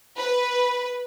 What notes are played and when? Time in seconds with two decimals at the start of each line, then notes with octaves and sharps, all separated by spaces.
0.17 B4